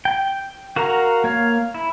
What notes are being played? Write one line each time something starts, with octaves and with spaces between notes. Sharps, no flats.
G5
F#4 A#4 F5 F#5 A#5
A#3 C#5 F5
E4